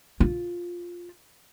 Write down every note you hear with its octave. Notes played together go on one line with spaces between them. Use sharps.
F4